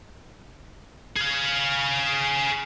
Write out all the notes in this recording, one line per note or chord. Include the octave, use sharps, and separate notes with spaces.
G#4 F5